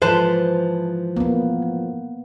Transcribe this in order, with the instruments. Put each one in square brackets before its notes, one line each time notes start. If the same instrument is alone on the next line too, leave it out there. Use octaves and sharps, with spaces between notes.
[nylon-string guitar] G#2 E3 F3 [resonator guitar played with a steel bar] B4 C5 A5
[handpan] A#3 B3